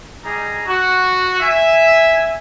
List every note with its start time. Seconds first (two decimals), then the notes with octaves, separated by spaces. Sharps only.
0.24 G3 D#4 G#4 A#5
0.67 F#4
1.40 E5 G#5